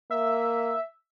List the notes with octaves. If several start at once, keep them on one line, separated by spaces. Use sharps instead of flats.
A#3 E5